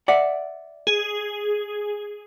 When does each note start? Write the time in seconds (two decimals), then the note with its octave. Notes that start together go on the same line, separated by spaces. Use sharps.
0.08 D5 E5 F#5
0.87 G#4